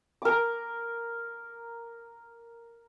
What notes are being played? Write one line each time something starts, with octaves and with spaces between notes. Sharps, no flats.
A#4 D6